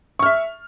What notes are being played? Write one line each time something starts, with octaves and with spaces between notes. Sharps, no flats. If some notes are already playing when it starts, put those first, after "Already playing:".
E5 C#6 F6